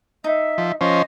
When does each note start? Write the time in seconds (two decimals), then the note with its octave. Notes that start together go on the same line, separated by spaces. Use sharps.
0.24 D#4 E5
0.58 F3
0.81 F3 C#4 C5 D#5